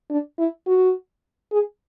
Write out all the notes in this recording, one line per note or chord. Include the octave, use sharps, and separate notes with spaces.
D4
E4
F#4
G#4